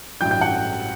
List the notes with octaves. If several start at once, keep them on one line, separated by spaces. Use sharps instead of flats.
A1 G2 F#3 G5 G6
G5 G6
F#5 F#6